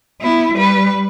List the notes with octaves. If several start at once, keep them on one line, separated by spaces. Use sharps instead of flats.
B3 E4
G3 B4